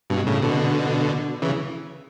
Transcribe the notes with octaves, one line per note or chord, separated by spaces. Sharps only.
G2 B2
A2 C#3
B2 D3
C#3 E3